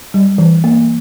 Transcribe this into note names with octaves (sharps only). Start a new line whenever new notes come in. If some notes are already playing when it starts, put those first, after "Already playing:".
G3
E3
A#3